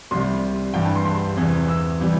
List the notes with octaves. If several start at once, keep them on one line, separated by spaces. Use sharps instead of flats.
C2 C3 G3 C6
G2 E3 G3 G5
A5
C6
C6
E2 C3 E3
E6
C3 E3 G3